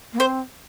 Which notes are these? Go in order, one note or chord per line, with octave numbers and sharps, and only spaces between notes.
A#3
C4 C5